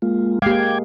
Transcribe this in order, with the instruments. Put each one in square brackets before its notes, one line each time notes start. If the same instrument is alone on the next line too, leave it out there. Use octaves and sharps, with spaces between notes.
[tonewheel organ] G#3 A#3 F4
[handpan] G#3 A#3 [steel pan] G4 F5 [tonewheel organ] G5 D6 G#6